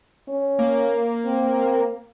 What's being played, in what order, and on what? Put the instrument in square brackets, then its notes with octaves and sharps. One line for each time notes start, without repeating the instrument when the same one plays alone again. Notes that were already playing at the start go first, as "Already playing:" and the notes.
[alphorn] C#4
[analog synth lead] A#3
[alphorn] C4